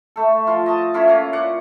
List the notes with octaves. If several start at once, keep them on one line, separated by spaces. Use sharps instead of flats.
A3 A4
F3 F4
D#5 A5
C#4 E4 F4 A4
A#3 C#4
A#2 D5 F#5